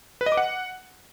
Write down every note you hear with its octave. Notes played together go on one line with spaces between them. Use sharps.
B4
D#5
D6
F#5